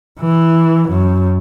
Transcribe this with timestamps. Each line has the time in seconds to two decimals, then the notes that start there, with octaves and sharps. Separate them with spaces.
0.20 E3
0.89 F#2